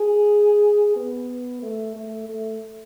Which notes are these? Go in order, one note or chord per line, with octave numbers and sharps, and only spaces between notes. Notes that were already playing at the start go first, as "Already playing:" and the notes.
Already playing: G#4
B3
A3
A3
A3